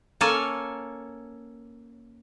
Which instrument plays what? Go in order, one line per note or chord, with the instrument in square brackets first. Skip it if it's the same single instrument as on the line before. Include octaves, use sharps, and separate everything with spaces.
[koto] A#3 C#4 A4 C#5 G#5 A5